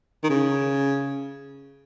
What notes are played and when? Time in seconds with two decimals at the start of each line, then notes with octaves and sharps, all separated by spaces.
0.23 D#3
0.29 C#3